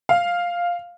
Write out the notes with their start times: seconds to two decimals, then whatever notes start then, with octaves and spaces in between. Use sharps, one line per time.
0.09 F5